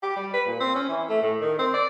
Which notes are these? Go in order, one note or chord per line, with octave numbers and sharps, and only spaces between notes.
G4
G3
B4
A#2
C4
C#4
E3
A3
A2
D#3
C4
D5